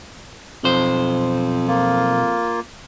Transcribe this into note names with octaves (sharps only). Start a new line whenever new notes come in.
B1 F2 C5
A#3 F4